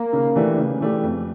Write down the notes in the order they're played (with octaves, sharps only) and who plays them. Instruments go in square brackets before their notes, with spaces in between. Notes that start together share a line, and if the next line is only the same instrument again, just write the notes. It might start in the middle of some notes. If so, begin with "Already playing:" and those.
Already playing: [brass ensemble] A#3
[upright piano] C#3
E3 A3 D4 G4
C#3
E3 A3 D4 G4
F2